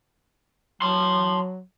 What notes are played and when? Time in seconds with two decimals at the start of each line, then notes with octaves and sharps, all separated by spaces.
0.82 F#3 A5 C6